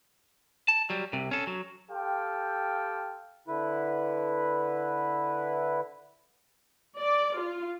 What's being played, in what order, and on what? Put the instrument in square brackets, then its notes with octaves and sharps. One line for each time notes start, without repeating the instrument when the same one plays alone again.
[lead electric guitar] A5
F#3 G3
C2 C3
C#4 A4
F#3
[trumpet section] G4 A4 F5 G5 C6
[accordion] D3 E4 B4
[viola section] D5
F4